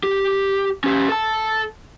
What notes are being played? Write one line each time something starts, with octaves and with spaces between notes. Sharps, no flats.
G4
C#4 G4
A4 A5